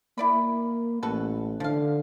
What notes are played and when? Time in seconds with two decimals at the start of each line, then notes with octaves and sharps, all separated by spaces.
0.18 A#3 E4 D5 B5
1.03 A1 F#4 A4 B4
1.60 D3 F3 F5